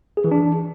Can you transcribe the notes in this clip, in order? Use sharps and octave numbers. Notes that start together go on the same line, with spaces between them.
G#4
E3
D4